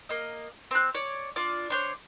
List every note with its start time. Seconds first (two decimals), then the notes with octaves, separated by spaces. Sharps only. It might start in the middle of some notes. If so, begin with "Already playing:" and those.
0.09 A#3 D#5
0.71 C4 F#6
0.95 C#5 D5
1.36 D4 F4 D5
1.70 D4 C5 C#5